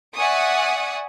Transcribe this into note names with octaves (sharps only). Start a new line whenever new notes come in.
D5 E5 F#5 G#5 C#6 D#6